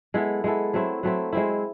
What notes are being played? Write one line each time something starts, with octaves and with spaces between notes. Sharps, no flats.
G#3 B3 E4 A4
G#3 B3 E4 A4
F#3 A3 C4 E4
F#3 A3 C4 E4
G#3 C4 E4